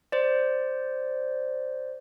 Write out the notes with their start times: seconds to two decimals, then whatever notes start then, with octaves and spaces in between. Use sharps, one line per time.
0.12 C5 D5